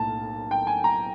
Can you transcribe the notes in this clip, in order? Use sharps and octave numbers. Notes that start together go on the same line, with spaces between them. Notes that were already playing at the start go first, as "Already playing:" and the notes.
Already playing: B1 A2 A#3 A5
G5
G#5
A#5